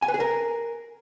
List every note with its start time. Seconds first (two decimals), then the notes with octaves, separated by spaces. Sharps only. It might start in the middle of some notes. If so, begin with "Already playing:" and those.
0.02 G#5
0.08 B4
0.14 G#4
0.20 A#4